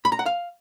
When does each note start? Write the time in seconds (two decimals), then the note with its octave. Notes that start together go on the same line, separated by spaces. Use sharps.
0.05 B5
0.12 A#5
0.19 F#5
0.26 F5